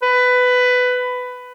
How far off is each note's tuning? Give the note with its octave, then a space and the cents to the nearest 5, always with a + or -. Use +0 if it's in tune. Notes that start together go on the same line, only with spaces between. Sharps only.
B4 +15